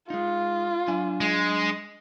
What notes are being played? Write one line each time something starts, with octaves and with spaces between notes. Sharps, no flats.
G#3 D#4 F4
F#3 D4 G#5
G#3